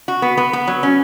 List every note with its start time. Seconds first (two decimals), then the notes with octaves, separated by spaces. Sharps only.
0.08 F#4
0.22 B3
0.38 B3
0.53 B3
0.68 F#3
0.83 C#4